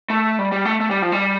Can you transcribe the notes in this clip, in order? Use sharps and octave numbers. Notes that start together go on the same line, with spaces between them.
A3
G3
G3
A3
A3
G3
F3
G3